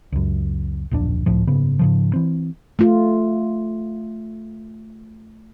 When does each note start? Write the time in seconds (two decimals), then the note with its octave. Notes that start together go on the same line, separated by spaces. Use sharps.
0.12 C#2 F#2
0.91 D1 A#1 F2 D4
1.26 G#1 C#2 A2 F3
1.47 F#1 G#2 C#3 B3
1.79 G#2 C#3 F3
2.13 E3 C4
2.79 A3 F4